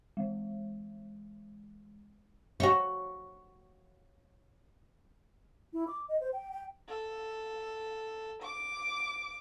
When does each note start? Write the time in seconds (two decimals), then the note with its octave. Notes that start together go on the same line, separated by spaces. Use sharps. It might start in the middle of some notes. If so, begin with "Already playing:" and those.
0.17 E3 G#3
2.60 F#4 C#5
5.73 E4
5.88 D6
6.09 D#5
6.20 C5
6.33 G5
6.52 G5
6.88 A4
8.42 D6